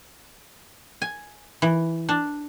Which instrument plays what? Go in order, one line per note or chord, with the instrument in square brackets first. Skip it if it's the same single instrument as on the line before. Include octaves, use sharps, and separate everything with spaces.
[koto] G#5
E3
D4